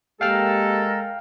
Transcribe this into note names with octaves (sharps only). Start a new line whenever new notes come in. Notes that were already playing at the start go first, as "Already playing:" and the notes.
G#3 A#3 G4 A4 A#4 F5 G5 F6